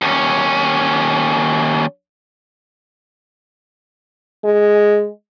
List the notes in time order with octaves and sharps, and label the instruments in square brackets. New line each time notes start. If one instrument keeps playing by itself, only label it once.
[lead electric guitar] D#2 C#4
[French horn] G#3